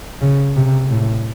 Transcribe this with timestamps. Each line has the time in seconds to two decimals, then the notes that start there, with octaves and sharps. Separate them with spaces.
0.21 C#3
0.56 C3
0.90 A2